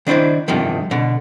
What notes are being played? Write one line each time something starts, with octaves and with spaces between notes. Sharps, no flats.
D#3 D4 E4 C5 D5
E2 G2 C3 D#3 F3
B2 D3